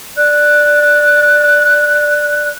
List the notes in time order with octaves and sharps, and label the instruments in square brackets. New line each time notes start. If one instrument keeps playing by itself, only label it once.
[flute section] D5 F#6